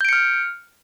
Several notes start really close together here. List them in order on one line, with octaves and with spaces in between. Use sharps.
G6 D7 C#7 F6